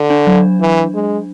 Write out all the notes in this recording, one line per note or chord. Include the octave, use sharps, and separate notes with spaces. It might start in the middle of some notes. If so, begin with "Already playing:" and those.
Already playing: D3
D4
F#3
E3
G#3